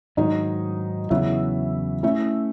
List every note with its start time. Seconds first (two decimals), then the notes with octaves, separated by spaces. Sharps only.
0.17 G#2 D#3 F#3 D#4 D#5
1.10 E2 C#3 F#3 B3 E4 E5
2.03 A3 C#4 E4 E5